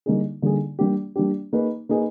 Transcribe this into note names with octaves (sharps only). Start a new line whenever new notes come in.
D3 G3 A#3 D#4 G#4
D3 G3 A#3 D#4 G#4
G3 A#3 D4 G4
G3 A#3 D4 G4
A#3 D#4 G#4 B4
A#3 D#4 G#4 B4